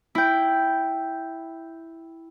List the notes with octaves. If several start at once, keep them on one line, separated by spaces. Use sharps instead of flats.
E4 G5